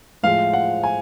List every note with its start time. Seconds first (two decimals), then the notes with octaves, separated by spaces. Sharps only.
0.23 A2 F3 G#3 F5
0.53 F#5
0.84 G#5